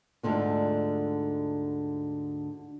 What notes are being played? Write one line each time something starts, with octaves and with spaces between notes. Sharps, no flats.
D2 G#2 D3 F4